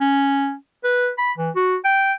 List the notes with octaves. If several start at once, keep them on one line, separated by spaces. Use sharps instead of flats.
C#4
B4
B5
E3
F#4
G5